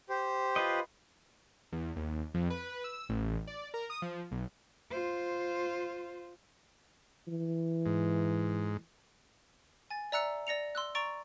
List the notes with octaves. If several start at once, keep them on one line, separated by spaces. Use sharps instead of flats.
G4 C5
F4 B4 D#5
E2
D#2
F2
B4
E6
A1
D5
A#4
D#6
F3
B1
F4 C5
E3
G#2
G#5 A6
D5 E5 A#5 E6 F#6 C#7
D5 A#6 C#7 F7
C6 E6 F#6
D5 A#5 C#6 A6 D7